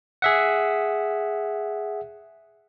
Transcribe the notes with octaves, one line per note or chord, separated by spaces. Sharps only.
G#4 E5 F#5